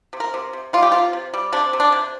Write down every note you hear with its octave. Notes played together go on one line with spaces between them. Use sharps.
C3
A#4
C3
C3
G3 F4
G4
C3 F4
C3
G3
C3 D4
C3
D4
C3